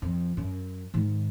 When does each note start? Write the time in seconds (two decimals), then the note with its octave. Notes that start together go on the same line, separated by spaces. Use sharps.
0.02 F2
0.37 F#2
0.94 G#2 D#3